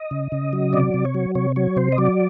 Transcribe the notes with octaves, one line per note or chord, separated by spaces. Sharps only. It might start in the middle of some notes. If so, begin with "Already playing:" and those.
Already playing: D#5
C#3
C#3
F#3
C3 D5
C3
C#5
F#3
C3 C#5
F#3 C#5
C3 C5
D#5
F#3 D5